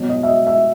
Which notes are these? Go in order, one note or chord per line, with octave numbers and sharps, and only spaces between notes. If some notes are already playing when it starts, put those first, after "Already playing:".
Already playing: B2 F#3
D#5
E5
D#5
E5